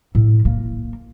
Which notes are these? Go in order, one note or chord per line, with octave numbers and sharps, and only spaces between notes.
A2
A#3